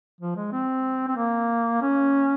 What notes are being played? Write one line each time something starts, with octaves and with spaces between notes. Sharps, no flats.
F3
G#3
C4
C4
A#3
C#4